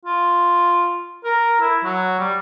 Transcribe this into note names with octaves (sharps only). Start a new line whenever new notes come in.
F4
A#4
E4
F#3
G3